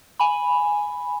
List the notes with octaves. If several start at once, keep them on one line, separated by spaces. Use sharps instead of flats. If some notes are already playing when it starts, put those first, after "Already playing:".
G#5 B5